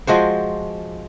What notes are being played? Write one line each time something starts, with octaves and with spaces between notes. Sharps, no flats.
F3 G#3 F#4 C5